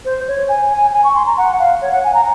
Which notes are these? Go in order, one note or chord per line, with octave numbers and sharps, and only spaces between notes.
C5
C#5
G#5
G#5
G#5
C#6
C6
A#5
F#5
F5
C#5
F#5
G#5
A#5